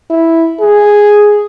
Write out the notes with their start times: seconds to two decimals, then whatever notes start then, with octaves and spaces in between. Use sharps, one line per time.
0.10 E4
0.60 G#4